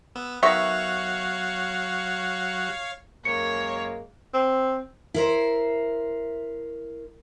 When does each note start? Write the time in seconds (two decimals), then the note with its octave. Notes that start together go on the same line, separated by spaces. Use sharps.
0.15 B3 E6
0.43 D#3 F#3 B3 F#4 C#5 E5 F5 C#6
3.25 F#2 G#3 A#3 C#5 C#7
4.34 C4
5.14 E4 A#4 C5